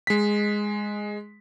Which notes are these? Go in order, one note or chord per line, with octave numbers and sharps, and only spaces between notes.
G#3 B6